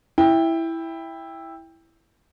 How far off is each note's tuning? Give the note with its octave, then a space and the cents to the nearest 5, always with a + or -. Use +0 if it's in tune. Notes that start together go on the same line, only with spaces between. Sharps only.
E4 +0 E5 +0 G5 +15